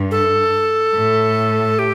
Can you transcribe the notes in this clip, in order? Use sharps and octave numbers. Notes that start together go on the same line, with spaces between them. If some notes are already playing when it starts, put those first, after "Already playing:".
Already playing: G2
A4
A2
G4